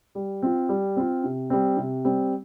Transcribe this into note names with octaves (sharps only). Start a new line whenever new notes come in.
G3
C4 F4
G3
C4 F4
C3
G3 C4
C3
G3 C4